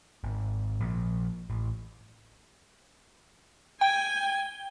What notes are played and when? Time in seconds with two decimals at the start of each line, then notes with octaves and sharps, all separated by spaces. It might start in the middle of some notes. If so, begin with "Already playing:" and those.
0.24 G#1
0.80 A#1
1.50 A1
3.81 G5 G#5